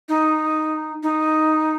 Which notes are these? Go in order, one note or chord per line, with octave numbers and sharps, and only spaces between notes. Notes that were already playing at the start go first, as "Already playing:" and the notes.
D#4
D#4